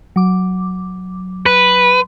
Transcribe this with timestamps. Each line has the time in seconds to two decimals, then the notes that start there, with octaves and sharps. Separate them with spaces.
0.16 F#3 D6
1.46 B4